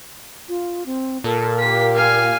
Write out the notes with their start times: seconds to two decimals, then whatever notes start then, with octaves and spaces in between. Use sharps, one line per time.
0.48 F4
0.86 C4
1.24 A#2 A4 A#4
1.60 A#3 G4 B6
1.95 F5 G#5